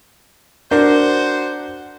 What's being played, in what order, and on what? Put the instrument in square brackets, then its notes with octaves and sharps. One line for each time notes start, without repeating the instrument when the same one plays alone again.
[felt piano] D4 A#4 [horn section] F#4 C5